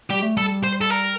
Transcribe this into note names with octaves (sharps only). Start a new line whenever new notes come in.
G3 G4
A3
G3 A4
C5
A4
A#4